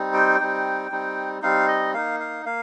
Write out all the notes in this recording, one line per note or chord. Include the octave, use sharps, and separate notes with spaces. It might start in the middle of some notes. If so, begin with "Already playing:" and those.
Already playing: G3 C4 D#4
G5
G3 C4 D#4
G3 C4 D#4
G3 C4 D#4 F5
D#5
A#3 D#4 F5
F5
A#3 F5